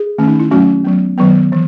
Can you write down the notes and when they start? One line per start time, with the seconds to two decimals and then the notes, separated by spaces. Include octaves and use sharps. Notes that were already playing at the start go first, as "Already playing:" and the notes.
Already playing: G#4
0.18 D#3 A3 C#4
0.28 D#4
0.40 E4
0.51 F#3 A3 C#4 F#4
0.84 F#3 B3
1.18 D#3 F#3 B3
1.52 E3